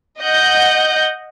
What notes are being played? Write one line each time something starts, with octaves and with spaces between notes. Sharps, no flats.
D#5 F#5 G6